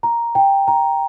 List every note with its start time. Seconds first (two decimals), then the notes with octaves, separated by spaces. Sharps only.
0.03 A#5
0.35 G5
0.68 A#5